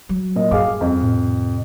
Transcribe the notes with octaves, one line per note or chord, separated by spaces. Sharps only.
F#3
A#2 D#5
G2 G#4 F5 D6
F2
A2 C3